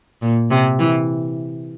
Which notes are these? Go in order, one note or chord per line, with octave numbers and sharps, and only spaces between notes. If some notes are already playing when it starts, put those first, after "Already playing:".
A#2
C3
E3